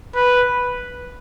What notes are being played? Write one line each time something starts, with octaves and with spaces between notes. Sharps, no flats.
B4